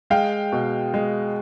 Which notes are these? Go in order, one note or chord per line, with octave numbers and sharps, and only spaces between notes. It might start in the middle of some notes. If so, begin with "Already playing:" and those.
G#3 F5 G5
B2
G#3